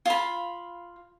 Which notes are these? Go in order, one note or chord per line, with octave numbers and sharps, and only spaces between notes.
F4 B5